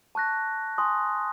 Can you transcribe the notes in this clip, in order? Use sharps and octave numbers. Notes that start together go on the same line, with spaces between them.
A5 C#6 F#6 A#6
G#5 C6 D#6